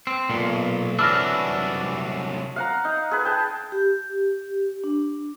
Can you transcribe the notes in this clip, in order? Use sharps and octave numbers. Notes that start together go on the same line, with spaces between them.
C4
B1 A#2
C2 E3 F#3 D4 E6 F6 A#6
F5 F#5 A#5
D#4
G#4 B4
G5 A5
G4
D4